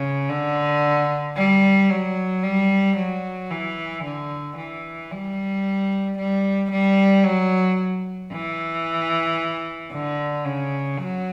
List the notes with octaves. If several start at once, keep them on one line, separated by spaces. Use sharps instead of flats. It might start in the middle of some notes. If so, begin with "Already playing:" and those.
Already playing: C#3
D3
G3
F#3
G3
F#3
E3
D3
E3
G3
G3
G3
F#3
E3
D3
C#3
F#3